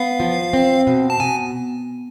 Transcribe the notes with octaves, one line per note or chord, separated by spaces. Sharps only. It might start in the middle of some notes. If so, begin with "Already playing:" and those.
Already playing: B3 F5
F3
C4
B2
A5
B2 G#5